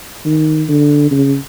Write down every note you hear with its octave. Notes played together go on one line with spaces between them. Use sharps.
D#3
D3
C#3